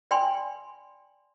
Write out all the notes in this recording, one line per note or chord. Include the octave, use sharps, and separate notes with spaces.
D5 G5 G#5 B5 C6